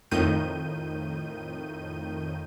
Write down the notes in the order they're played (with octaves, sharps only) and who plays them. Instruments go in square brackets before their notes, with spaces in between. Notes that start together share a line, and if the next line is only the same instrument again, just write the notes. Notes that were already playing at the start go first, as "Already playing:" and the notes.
[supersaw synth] F2 A2 D#3 G6 D#7